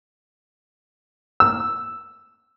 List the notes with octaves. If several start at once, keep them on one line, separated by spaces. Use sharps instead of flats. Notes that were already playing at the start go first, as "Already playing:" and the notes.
E6